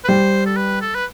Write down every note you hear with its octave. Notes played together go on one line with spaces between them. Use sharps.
B4
G3 C5
A4
B4
A4
B4